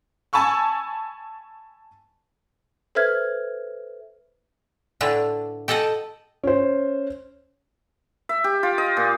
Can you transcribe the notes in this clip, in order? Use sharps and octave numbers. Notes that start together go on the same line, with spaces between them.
G#5 A5 B5 C#6 E6
A4 B4 C5 E5 F6 G#6
A2 D3 D4 B4
G4 A4 D#5 F#5 A5
C#4 C5
E5
G4
F4
D#5
A#2